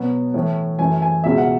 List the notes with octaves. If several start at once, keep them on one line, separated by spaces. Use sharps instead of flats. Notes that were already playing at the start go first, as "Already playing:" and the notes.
Already playing: B2 F#3 B3
A2 E3 A3
F#2 E3 A3 G#5
G#5
C#2 B2 G#3 E5
F#5